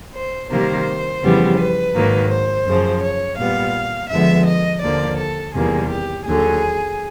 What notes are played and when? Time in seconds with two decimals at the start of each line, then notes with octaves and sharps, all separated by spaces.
0.15 C5
0.50 C3 D#3 G3 A#3 C5
1.22 F2 C#3 E3 G3 B3
1.58 B4
1.94 G#2 D#3 F#3 A#3
2.30 C5
2.66 F#2 C#3 F3
3.02 C#5
3.37 A#2 G3 B3 F5
4.10 F2 D3 F3 G#3 B3 E5
4.45 D#5
4.82 D#2 D3 F3 A#3 D5
5.17 A4
5.53 E2 C3 D#3 G3 A#3 G#4
5.89 G4
6.25 D#2 D3 F#3 G#4